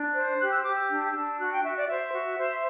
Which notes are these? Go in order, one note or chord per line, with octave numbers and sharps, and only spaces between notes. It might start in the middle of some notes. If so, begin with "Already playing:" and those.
Already playing: D4
C5
G4 F#6
E6
G4 D6
E6
D4
D4
F#4 F#6
G5
F#4 E5
D5
C5 E5
F#4
C5